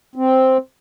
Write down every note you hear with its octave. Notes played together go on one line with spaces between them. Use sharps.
C4